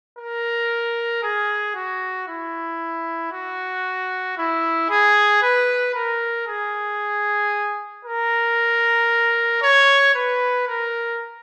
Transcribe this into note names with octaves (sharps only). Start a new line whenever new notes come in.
A#4
G#4
F#4
E4
F#4
E4
G#4
B4
A#4
G#4
A#4
C#5
B4
A#4